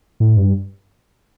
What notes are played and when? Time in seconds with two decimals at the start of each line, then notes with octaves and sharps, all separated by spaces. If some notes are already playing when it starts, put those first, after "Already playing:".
0.20 A2
0.37 G2